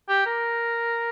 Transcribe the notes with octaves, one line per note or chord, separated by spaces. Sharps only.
G4
A#4